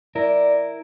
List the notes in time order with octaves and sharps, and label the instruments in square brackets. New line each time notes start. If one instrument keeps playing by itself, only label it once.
[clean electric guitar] E4 A#4 [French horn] D5